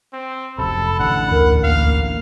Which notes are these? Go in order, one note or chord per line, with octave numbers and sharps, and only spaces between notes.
C4
F1 F#2 C3 A4 B5
A1 D3 F#5 B5
D2 A#4
D2 A#3 F5